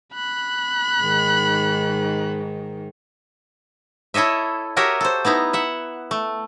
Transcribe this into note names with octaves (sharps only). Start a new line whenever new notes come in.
B5 F#6
G#2 D#3
E4 A4 C#5 D#5 E5
F#4 G4 A#4 C#5 D#5 E5
A4 C5
B3 D#4 E4 A#5
E5 F#5
A3